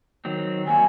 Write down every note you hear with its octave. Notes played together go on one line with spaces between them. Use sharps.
D#3 F#3 C4
G3 A#3 F#4 G#5